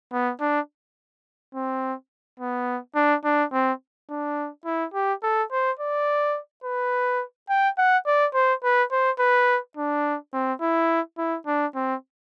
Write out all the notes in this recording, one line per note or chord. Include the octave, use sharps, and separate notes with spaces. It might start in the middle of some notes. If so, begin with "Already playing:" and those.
B3
D4
C4
B3
D4
D4
C4
D4
E4
G4
A4
C5
D5
B4
G5
F#5
D5
C5
B4
C5
B4
D4
C4
E4
E4
D4
C4